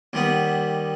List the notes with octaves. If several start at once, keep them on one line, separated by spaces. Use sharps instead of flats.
D#2 G3 B3